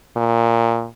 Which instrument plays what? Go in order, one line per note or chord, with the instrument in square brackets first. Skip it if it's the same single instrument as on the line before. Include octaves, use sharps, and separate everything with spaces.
[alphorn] A#2